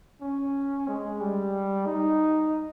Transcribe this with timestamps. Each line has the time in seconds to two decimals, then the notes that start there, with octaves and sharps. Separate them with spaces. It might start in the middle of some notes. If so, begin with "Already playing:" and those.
0.21 C#4
0.88 G#3
1.21 G3
1.86 D#4